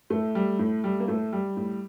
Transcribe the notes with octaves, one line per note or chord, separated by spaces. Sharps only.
A2 A3
G3
A2
G3
A#3
A2 A3
G3
A2